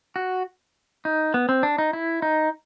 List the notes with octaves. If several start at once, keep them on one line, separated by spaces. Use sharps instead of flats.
F#4
D#4
B3
C4
D4
D#4
E4
D#4